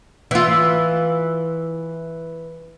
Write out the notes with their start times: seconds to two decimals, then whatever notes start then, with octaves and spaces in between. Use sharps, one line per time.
0.31 E3 F4